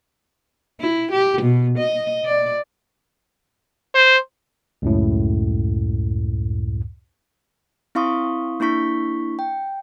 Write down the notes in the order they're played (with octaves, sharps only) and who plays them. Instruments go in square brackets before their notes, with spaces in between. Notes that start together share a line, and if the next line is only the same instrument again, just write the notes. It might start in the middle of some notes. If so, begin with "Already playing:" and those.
[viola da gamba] E4
G4
B2
D#5
D5
[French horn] C5
[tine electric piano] C#2 F#2 A2
[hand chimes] C4 E4 F5 C6 C#6 D#6
A#3 D4 E4 C#6 B6
G5